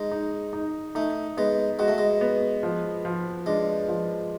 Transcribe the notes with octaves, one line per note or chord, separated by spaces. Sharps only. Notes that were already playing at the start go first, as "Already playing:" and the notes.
Already playing: G#3 D#4
D#4
D#4
A3 D#4
G#3 B3
G#3 F#4
A3
G#3
B3
F3
F3
G#3 D4
F3